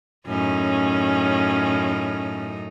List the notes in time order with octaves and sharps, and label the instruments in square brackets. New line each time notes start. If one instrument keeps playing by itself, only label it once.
[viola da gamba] F#2 A2 D#4 [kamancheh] C#4